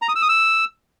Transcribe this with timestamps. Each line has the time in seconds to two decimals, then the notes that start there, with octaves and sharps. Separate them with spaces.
0.02 A#5
0.09 D#6
0.15 E6
0.22 D#6
0.29 E6